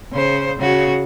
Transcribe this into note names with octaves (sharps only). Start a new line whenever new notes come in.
C#3 C5
C#3 F#4